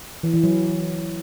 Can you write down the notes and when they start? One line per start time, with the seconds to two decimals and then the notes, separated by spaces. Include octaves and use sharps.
0.23 E3
0.33 E3
0.44 F#3